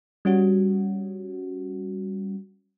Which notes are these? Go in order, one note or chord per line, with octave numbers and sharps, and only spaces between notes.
G3 C#4 F#4